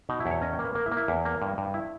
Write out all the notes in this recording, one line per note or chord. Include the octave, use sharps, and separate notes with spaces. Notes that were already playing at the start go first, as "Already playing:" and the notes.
B2 D#4
E4
E2
C#5
C#4 D#5
G5
A#3
B4
A#3 A#4
E4
A#3
E4
E2
A#3
G2
G2
E4